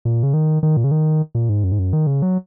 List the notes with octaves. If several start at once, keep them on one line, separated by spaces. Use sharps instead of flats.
A#2
C#3
D#3
D#3
A#2
C#3
D#3
A#2
G#2
F#2
G#2
F#2
D#3
C#3
F#3